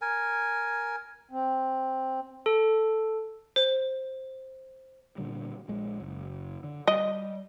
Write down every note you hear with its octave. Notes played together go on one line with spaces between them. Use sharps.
A#4 G#5
C4
A4
C5
A#2 D3 G3
A#1 G#3
F#1
D3
G3 D#5